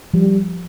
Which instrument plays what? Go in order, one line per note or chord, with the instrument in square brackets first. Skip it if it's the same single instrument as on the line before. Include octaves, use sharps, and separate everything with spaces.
[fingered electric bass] F3 [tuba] G3